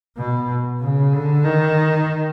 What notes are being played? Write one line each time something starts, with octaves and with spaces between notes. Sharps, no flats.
B2
C#3
D3
D#3